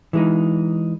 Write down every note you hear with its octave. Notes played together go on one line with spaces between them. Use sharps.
E3 G#3 D#4